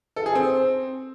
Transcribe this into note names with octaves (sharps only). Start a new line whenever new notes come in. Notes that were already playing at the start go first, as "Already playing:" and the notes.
A4
G#4
C4